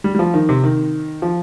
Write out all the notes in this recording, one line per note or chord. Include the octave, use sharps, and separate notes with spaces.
G3
G3
F3
D#3
C3
D#3
F3